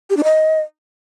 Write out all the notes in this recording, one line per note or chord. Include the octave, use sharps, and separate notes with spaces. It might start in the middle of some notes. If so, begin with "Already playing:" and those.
G4
D4
D#5